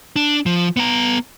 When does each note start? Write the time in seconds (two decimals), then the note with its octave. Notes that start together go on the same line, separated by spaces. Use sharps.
0.16 D4
0.46 F3
0.77 B3 A#5